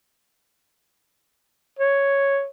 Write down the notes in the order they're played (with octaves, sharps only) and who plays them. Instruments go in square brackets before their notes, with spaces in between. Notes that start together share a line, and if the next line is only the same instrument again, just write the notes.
[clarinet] C#5